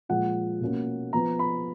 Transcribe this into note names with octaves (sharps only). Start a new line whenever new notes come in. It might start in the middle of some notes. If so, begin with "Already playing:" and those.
A#2 F3 G#3 F#5
B2 A#3 C#4
F3 B3 A#5
B5